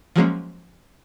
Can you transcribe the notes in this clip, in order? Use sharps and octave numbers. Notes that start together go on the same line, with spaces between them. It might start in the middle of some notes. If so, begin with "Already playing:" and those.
F3 F#3 G#3 A#3 C#4